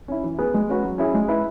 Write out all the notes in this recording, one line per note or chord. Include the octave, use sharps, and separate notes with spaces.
C#4 E4
E3
B3 G#4 B4
G#3
C#4 F#4 B4
F#3
C#4 E4 G#4
G#3
E4 B4